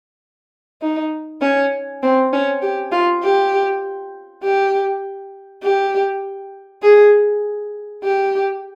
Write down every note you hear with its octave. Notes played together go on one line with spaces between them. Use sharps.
D#4
C#4
C4
C#4
G4
F4
G4
G4
G4
G#4
G4